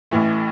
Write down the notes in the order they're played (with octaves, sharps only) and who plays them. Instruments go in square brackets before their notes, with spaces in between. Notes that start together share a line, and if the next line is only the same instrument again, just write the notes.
[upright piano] A1 A2 E3 A3